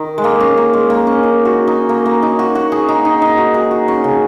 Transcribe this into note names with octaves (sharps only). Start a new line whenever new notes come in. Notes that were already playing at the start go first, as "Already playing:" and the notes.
Already playing: D#3
G#3
A#3
C#4
A#3
G#3
A#3
C#4
D#4
F#4
D#4
A#3
A#3
D#4
F#4
F#4
G#4
D#4
D#4
D#4
F#4
G#4
F#4
C#4
C#3